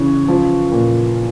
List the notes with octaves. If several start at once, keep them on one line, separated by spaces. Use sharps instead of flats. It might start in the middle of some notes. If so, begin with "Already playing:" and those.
Already playing: C#3 E3 C#5
F3
A#2